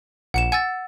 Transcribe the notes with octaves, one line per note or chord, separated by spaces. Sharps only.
A#1 F#5 C#7 E7
F#5 G#5 E6 A6